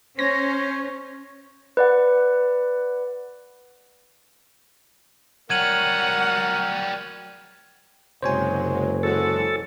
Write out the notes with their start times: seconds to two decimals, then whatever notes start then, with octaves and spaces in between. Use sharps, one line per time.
0.19 C#4 C5 C#5 A#6
1.77 B4 D5 F#5
5.50 F#3 G3 A#4 F#5 G#6 D#7 F#7
8.23 F#1 C3 F#3 G#3 C5 C#5 G#5
9.03 E3 G#3 F#4 A4